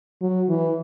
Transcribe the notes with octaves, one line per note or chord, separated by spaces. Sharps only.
F#3
E3